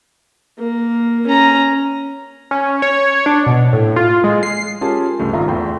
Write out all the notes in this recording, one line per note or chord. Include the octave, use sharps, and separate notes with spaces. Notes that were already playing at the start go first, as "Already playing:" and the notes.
A#3
C#4 A#5
C#4
C#5
D4
B2
A2
F4
G#3
C7
C#4 F4 G4 G#4 A#4 A5
C#2 G2 A3
G#1 F4 E5 F5 A#5
E2 A3 G5 B5 C6